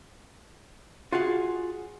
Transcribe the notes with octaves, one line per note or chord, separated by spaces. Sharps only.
F4 F#4 G#4 F5 F#5